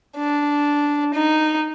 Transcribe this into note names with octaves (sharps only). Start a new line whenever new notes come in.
D4
D#4